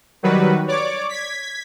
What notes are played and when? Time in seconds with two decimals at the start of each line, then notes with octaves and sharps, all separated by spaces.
0.23 D#3 F#3 G3 F#4 B4
0.68 C#5 D5 D6
1.09 G#6 B6